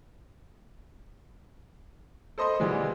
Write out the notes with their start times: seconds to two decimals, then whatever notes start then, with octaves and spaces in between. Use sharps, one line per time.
2.38 A4 C5 D#5 B5 C6
2.60 D2 B2 E3 G3 G#3